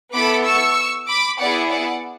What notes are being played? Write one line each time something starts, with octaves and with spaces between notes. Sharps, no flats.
B3 E4 A4 B5 D6
C#6 E6
B5 D6
B3 E4 G#4 D5 F#5
D5 F#5